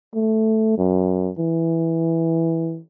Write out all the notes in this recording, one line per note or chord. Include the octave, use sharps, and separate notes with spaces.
A3
F#2
E3